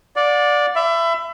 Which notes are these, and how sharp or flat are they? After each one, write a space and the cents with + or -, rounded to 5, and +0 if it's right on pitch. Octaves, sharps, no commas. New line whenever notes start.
D5 +0 F#5 -45
E5 +25 B5 +30